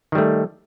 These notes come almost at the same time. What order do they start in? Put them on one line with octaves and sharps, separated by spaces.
D#3 G3 A3